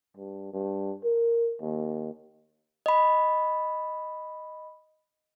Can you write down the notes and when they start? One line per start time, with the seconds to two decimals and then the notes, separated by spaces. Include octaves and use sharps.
0.17 G2
0.53 G2
1.04 A#4
1.61 D#2
2.86 D#5 B5